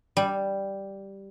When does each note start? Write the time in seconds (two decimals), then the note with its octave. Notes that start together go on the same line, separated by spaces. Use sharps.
0.17 G3